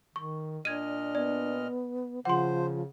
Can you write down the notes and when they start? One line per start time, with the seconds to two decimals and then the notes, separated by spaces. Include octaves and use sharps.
0.16 D#3 C#6
0.65 A#2 D4 D#5 F6 G#6 D#7
1.15 B3 D5
2.25 C#3 F3 C5 F#5 C6